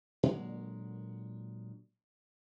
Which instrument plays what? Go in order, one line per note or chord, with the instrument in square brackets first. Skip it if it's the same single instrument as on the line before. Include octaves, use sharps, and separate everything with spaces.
[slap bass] A#2 D3 F#3 G#3